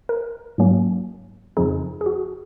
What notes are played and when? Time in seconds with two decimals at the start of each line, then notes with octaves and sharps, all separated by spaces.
0.09 A#4
0.58 G#2 F#3 A#3 C#4
1.57 F2 C#3 F3 C4 D#4 G#4
2.01 G#4
2.06 F#4